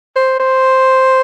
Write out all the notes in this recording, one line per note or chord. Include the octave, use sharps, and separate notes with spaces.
C5
C5